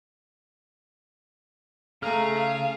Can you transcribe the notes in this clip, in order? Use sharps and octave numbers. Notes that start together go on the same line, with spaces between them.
C#3 A3 G#4 F5 A#5 F6
F5